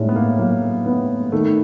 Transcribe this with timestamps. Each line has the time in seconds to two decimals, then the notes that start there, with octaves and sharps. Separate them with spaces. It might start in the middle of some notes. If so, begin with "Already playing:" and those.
Already playing: A2 G3 G#3 D#4
0.09 B3
0.16 A#3
0.39 F#3 A#3
0.86 B3
1.32 D#3 A3